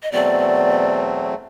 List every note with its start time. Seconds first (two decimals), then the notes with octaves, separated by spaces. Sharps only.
0.03 D#5
0.12 E2 B2 F#3 A3 C4 D5